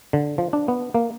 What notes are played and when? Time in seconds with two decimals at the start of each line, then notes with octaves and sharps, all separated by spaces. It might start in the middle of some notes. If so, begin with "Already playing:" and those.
0.13 D3
0.38 F3
0.53 D4
0.68 B3
0.94 A#3